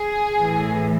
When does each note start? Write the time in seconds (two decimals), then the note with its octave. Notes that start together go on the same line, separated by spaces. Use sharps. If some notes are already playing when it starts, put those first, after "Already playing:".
Already playing: G#4
0.37 A2 E3